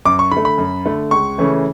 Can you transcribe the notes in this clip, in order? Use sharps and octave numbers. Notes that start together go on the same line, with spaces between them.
F#2 D6
C#6
D3 B5
A3
B5
F#2
D3 A3
C#2 C#6
C#3 E3 A3 C#4